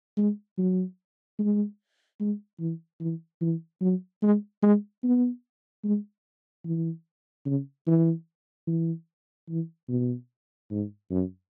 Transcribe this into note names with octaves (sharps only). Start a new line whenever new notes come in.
G#3
F#3
G#3
G#3
E3
E3
E3
F#3
G#3
G#3
B3
G#3
E3
C#3
E3
E3
E3
B2
G#2
F#2